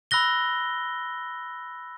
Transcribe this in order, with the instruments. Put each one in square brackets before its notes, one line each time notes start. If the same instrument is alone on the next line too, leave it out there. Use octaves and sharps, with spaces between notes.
[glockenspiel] B5 E6 F#6 A#6 G7